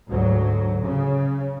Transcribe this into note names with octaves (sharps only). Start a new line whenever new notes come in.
D2 G#2 F#3
C#3